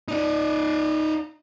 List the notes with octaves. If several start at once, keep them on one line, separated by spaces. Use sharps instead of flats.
D#4 D5